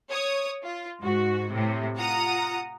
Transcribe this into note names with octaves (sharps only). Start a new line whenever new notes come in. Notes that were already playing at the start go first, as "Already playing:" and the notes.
C#5 D#6
F4
G#2 F#4
A2 C3
F4 F#5 A#5 D#6